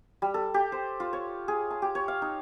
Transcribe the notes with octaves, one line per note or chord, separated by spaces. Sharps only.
G3
A4
G4
C5
F4
C#5
G#4
A5
G4
C#5
F5
D#4